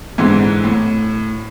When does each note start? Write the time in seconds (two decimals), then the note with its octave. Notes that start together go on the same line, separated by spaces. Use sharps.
0.18 G#2 D3 E3 C4
0.64 A2